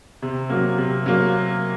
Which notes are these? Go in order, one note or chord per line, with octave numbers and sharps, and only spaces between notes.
C3
F#3 A#3
C3
F#3 A#3